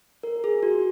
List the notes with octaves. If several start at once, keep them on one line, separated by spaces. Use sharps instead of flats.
A#4
G#4
F#4